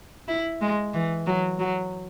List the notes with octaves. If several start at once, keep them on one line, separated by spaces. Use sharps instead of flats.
E4
G#3
E3
F#3
F#3